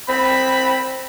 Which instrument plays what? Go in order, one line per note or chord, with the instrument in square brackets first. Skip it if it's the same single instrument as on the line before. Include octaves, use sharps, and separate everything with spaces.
[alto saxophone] C4 [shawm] B5